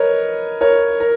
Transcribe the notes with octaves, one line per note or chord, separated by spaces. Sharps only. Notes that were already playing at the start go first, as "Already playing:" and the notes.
Already playing: A#4 B4 C#5 D#5
A#4 C#5
A#4